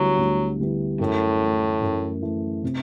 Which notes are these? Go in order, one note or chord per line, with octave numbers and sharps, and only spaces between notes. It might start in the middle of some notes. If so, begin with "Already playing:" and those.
Already playing: D2 D3 F#3 G3 B3 E4
D2
D3 G3 B3 E4
F#2 A2
E3 A3
F#2
E3 A3
C3